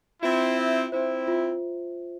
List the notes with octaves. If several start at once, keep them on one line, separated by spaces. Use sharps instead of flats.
C4 E4 F4
E5
C4 E4 C5
F4